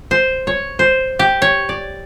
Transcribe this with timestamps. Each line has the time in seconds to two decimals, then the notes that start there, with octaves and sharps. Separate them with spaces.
0.11 C5
0.47 C#5
0.79 C5
1.19 G4
1.42 C#5
1.69 D5